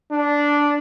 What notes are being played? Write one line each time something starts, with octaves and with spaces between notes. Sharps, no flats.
D4